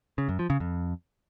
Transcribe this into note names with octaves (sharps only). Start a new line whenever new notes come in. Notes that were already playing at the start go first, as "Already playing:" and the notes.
C#3
F#2
F3
C#3
F2